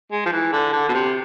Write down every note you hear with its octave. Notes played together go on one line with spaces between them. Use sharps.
G#3
F3
E3
D3
D3
B2
C3